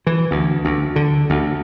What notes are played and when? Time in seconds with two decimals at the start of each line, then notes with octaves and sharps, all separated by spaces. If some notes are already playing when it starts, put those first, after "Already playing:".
0.07 E3
0.31 D2
0.65 D2
0.96 D3
1.30 D2